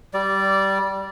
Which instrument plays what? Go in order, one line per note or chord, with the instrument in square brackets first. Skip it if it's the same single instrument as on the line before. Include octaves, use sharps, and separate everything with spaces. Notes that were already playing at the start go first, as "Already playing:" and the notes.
[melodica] G3 D5